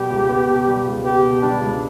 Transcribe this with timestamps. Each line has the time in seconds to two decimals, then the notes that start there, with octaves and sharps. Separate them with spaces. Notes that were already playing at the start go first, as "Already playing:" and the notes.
Already playing: B2 G3 B3 G4
0.10 C#2
0.29 B3
0.48 B2
0.66 G3
0.86 C#2
1.04 B3 G4
1.22 B2
1.42 G3 D4
1.60 C#2